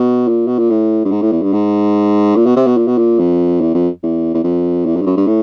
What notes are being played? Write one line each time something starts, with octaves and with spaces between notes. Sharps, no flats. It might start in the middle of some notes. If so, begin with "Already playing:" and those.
Already playing: B2
A#2
B2
A#2
A2
G2
G#2
A2
E2
G2
G#2
A#2
B2
C3
B2
A#2
B2
A#2
F2
E2
F2
E2
E2
F2
E2
F2
G2
F#2
G2
A2